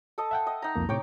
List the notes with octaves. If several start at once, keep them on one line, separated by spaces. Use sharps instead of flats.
A4 D#5 A5
E5 F#5 G5
D#5
D#4 A#5
C2 F2 A#3
A2 C3 C#5 G5 D6